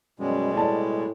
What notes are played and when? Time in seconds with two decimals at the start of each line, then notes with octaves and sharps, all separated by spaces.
0.19 F#2 B2 G3 G#3
0.53 A2 D5 A5